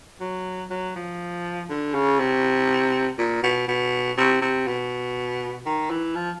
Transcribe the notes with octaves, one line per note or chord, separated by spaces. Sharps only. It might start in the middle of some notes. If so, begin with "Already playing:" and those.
F#3
F#3
F3
D3
C#3
C3
A#2
B2
B2
C3
C3
B2
D#3
E3
F3